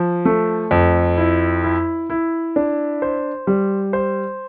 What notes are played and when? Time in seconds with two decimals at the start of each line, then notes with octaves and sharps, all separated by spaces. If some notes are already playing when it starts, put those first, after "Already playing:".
Already playing: F3
0.25 A3
0.71 F2
1.17 E4
1.64 E4
2.10 E4
2.56 D4
3.02 C5
3.47 G3
3.93 C5